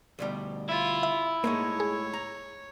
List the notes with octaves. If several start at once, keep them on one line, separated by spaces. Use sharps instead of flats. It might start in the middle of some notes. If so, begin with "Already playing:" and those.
D2 B2 G3
E4 F4
E5
A2 G#3 A#3 D#4 C#5
G#4
A#5